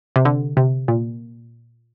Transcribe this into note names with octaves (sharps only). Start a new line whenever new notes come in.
C3
D3
C3
A#2